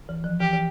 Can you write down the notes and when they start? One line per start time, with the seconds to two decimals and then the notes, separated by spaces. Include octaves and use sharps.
0.09 E3
0.24 F3
0.40 E3 G4
0.53 E3